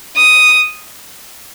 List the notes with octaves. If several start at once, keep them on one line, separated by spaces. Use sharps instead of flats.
D#6